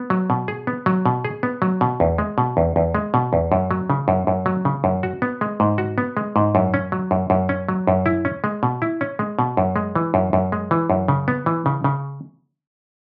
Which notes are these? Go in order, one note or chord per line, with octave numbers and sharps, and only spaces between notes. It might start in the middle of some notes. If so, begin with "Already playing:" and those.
Already playing: B3
F#3
B2
G#4
B3
F#3
B2
G#4
B3
F#3
B2
E2
G#3
B2
E2
E2
G#3
B2
E2
F#2
F#3
C#3
F#2
F#2
F#3
C#3
F#2
F#4
B3
G#3
G#2
F#4
B3
G#3
G#2
F#2
C#4
F#3
F#2
F#2
C#4
F#3
F#2
E4
C#4
G#3
B2
E4
C#4
G#3
B2
F#2
G#3
E3
F#2
F#2
G#3
E3
F#2
C#3
B3
E3
C#3
C#3